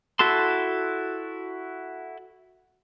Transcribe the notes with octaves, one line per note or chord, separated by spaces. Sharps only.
E4 F#4 A4 A5 C6